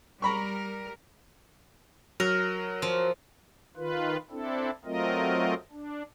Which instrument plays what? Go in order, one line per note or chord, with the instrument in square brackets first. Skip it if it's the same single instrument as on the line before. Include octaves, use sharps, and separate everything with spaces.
[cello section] G3 A#4 [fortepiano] A#5 B5 C#6
[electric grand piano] F#3 [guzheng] A#4
[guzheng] F3
[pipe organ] D#3 F4 B4
C4 D4 E4 A4
F#3 A3 C4 F4 A#4 D#5
D4